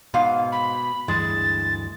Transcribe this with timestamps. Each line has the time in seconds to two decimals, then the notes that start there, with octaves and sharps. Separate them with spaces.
0.14 G#2 B2 F5
0.52 B5
1.08 D2 G2 E3 G#3 A6